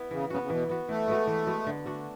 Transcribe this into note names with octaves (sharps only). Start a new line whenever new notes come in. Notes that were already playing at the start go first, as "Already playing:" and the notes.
Already playing: B3 E4
C#3 E3
C#3 B3 F#4
C#3
B2 E3
B3 F#4
E3 A3
G#3 B3 F#4
E3
G#3 B3 F#4
D3
A3 D4 F#4